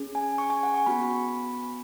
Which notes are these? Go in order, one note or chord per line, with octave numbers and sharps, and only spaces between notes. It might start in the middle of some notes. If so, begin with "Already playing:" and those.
Already playing: C#4 G#4
G#5
C#6
G#5
F#5
C#6
B3 F#4 B5